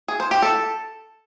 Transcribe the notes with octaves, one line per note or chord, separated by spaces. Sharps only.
G#4
C5
G4
A4